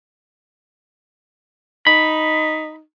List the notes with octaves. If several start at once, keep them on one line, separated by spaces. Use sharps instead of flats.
D#4 B5